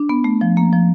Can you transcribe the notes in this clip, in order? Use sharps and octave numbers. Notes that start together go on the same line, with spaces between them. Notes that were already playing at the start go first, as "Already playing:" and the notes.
Already playing: D4
B3
A3
F3
A#3
F3